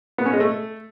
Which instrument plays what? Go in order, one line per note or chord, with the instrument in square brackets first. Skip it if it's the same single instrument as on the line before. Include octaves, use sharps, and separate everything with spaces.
[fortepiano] B3
C#4
G#3
A3